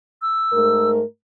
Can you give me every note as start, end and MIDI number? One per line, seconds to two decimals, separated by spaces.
0.22 0.90 88
0.53 1.03 44
0.53 1.03 57
0.53 1.03 70